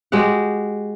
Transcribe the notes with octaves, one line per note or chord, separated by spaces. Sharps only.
G#3 F#4 G4 F#5